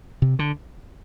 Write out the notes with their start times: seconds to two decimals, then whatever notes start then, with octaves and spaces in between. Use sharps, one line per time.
0.22 C3
0.39 D3